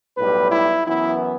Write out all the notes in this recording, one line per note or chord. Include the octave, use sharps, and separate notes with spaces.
B1 A2 G3 B4
E4
F#2 E3 B3 E4